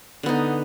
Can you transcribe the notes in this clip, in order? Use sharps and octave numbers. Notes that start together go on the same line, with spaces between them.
D3 B3 D#4